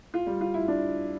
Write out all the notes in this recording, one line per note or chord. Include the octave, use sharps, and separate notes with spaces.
F4
G3
F4
E4
D4